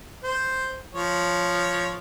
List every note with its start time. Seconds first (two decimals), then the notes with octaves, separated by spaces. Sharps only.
0.24 C5
0.94 F3 C#5